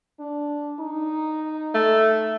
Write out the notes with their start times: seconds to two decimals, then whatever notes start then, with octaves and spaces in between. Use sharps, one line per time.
0.20 D4
0.80 D#4
1.75 A3